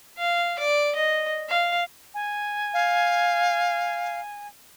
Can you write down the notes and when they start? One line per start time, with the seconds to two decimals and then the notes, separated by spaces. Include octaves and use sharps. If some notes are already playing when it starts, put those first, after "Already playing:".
0.18 F5
0.59 D5
0.95 D#5
1.49 F5
2.14 G#5
2.74 F5